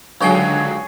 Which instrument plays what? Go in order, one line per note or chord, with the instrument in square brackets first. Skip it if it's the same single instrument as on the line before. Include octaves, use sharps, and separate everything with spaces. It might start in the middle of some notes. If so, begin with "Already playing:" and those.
[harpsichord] C#2 D#4 G5 [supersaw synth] D3 F#3 [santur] G#4 C#5